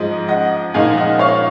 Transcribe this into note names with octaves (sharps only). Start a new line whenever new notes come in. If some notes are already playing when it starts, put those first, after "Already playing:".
Already playing: G#2 F3 G#3 D#5
D#5 F#5
A#2 F3 G#3 D#4 F5 G#5
D#5 F#5
C#5 F5